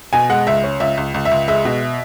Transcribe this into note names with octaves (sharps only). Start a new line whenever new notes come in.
B2 G#5
G#3 F#5
C#2 E5
C#4
C#2 E5
C#2
C#2
E5
C#2
G#3 E5
B2